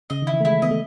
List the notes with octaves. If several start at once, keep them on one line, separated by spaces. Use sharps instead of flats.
C#3 D#5
D#3 E4
E3
A3
G#3 E4
A3
B3 D#5
A3